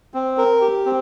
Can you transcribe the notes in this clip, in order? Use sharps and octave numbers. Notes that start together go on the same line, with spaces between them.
C4
A#4
G4
C4